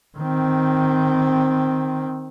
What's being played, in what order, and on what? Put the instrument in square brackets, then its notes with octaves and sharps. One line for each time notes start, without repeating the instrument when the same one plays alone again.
[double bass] D#3 C4